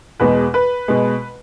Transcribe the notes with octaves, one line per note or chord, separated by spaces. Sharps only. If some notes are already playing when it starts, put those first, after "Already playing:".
E2 B2 G#3 B4
B4
B2 G#3